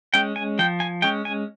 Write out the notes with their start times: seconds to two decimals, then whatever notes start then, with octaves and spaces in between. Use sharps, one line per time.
0.14 G#3 C#4 G5
0.36 G#5
0.59 F3 G5
0.80 G#5
1.02 G#3 C#4 G5
1.25 G#5